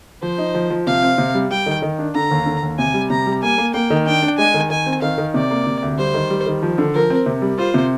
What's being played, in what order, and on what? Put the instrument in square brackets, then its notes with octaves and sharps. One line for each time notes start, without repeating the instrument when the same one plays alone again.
[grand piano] F3 [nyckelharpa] C5
[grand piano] D#4
F3
F3
[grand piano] C3 [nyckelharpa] F5
[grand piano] C4
C3
G3
[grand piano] G3 [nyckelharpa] G5
[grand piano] D#3
D#3
D4
[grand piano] D3 [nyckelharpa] A#5
[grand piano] D#2
D3
D#2
[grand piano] C3 [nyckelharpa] G#5
[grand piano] G3
[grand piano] C3 [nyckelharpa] A#5
[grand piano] G3
[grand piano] A#3 [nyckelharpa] G#5
[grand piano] A#3
[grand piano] A#3 [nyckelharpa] G5
[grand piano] D#3
[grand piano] D4 [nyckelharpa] G5
[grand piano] D4
[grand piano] G#3 [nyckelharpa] G#5
[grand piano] D#3
[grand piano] D#3 [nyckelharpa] G#5
[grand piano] C4
[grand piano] D#3 [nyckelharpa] F5
[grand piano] D#3
[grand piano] C3 [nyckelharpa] D5
[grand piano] A#3
C3
D2
[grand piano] G3 [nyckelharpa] C5
[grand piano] D#3
G3
D#3
F3
D3
[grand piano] F3 [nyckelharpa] A#4
[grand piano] C4
C3
G3
[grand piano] F4 [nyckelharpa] C5
[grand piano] C3